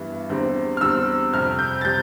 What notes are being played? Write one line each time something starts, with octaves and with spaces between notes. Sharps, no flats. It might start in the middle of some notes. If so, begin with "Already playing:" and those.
Already playing: G2 E3 G3 B3
E2 D3 G3 C4
F6
E2 D3 G3 C4 E6
F2 C3 G3 F6
G6
A6
C3 G3 G6